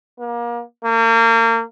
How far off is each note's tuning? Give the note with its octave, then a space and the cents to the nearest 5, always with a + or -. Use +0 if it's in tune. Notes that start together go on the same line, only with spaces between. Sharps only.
A#3 +30
A#3 -35